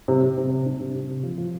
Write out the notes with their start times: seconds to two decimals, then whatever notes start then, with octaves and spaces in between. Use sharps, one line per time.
0.08 C3
0.23 C3
0.38 C3
0.52 C3
0.66 D4
0.80 C3
0.95 C3
1.09 C3
1.23 F3
1.38 F3